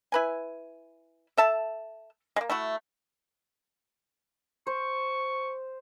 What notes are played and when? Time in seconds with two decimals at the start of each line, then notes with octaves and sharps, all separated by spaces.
0.12 E4 B4 G#5
1.37 A4 E5 A5
2.36 G#3 A#3
2.50 A3 E4 F#4
4.67 C5 C#6